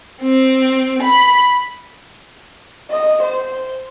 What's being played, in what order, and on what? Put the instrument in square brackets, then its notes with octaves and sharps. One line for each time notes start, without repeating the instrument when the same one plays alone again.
[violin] C4
B5
[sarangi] D#5
C5